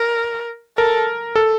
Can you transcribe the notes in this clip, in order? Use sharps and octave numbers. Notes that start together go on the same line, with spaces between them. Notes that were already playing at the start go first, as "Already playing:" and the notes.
Already playing: A#4
A4 A#4
A4